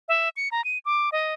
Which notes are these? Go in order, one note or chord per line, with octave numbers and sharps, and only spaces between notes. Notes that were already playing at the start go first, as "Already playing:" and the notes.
E5
C#7
A#5
D#7
D6
D#5